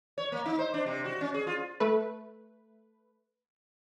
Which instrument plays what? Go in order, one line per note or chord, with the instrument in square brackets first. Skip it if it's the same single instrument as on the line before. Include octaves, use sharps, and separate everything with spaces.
[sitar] C#5
A#3
D#4
C5
D4
C3
F#4
C#4
G#4
F4
[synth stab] A3 B4